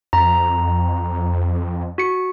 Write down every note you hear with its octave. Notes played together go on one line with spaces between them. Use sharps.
F2 A#5
F#4 C#7